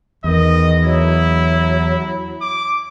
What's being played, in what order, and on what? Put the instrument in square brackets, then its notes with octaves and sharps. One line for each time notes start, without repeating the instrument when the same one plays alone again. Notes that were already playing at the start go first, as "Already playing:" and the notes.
[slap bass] E2 [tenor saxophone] D#3 [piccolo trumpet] D#5
[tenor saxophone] F#3 [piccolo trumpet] E4
[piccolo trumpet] D6